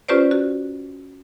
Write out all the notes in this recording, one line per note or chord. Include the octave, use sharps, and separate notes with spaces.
C#4 F4 G4 B4 C5 D5
F#4